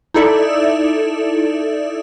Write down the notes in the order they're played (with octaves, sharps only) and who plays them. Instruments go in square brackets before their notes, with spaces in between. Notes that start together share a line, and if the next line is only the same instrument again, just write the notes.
[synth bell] D#4 E4 A4 D5 E5